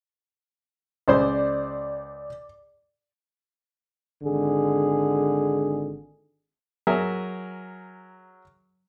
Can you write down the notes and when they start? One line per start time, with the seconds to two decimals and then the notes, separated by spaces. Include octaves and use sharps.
1.08 C#2 C5 D5 C6
4.23 G#1 D3 G#3 G#4
6.87 F#3 G#4 A#4 E5